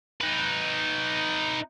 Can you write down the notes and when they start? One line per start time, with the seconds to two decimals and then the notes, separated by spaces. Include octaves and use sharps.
0.21 D#4 B4